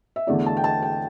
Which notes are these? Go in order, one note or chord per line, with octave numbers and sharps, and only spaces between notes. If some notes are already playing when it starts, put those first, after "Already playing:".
E5
E2 D3 A3 E4 D5
A5
G5
A5
G5